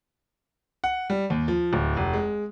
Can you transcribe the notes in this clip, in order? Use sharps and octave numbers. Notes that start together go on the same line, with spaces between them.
F#5
G3
D#2
F3
D1
F1
G#3